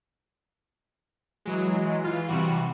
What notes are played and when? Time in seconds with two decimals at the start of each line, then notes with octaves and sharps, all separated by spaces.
1.46 E3 F#3 G#3
2.04 E3 F4
2.28 C3 E3 G3 F#4